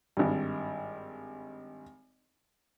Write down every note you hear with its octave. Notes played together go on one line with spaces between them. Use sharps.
G#1 G2